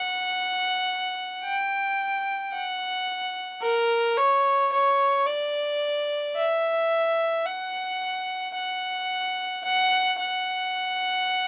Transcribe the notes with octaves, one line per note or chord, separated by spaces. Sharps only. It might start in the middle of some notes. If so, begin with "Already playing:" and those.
Already playing: F#5
G5
F#5
A#4
C#5
C#5
D5
E5
F#5
F#5
F#5
F#5